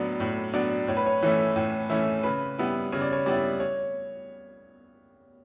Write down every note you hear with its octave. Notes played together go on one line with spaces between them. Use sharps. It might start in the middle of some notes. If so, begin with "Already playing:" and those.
Already playing: A2 F#3 B3 D4
A2
F#3 B3 D4
A2 C#5
B4
C#5
E3 A3 C#4 E4
A2
E3 A3 C#4 E4
C#3 B4
G3 B3 E4
C#3 C#5
D5
C#5
G3 B3 E4 D5
C#5